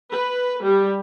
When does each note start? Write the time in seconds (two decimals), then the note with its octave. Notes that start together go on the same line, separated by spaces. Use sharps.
0.10 B4
0.63 G3